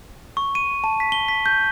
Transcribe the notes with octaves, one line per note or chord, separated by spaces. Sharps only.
C#6
D#7
A5
B6
G7
B6
G6